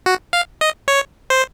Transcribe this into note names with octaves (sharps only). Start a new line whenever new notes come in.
F#4
F5
D#5
C#5
C5